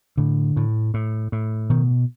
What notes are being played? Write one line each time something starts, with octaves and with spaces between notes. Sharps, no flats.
A2 D3
A2
A2
A2
B2 D#3